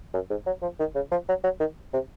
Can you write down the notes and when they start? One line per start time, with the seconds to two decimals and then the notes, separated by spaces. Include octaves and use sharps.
0.14 F#2
0.30 G#2
0.47 F#3
0.62 F3
0.80 D#3
0.95 C#3
1.12 F3
1.29 F#3
1.44 F#3
1.60 D#3
1.94 C3